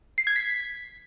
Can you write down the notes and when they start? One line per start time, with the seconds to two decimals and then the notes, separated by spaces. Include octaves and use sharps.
0.18 C7
0.27 G#6
0.36 B6